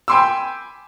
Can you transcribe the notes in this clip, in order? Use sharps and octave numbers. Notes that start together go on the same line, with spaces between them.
G5 G#5 B5 C6 D6 E6